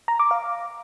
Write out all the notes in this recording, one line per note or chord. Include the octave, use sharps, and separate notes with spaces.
A#5
D6
F5